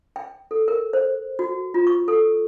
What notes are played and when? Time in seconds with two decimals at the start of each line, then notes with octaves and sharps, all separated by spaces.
0.16 G5
0.51 A4
0.68 A#4
0.93 C5
1.39 F#4
1.74 F4
1.87 C#6
2.08 A4